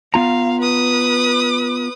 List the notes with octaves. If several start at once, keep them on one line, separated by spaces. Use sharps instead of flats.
B3 F4 F5 A#5
B4 D#6